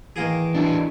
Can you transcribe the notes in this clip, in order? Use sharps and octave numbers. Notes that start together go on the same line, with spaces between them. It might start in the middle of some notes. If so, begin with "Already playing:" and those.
D#3 E3 A#3 G#4
D4 E4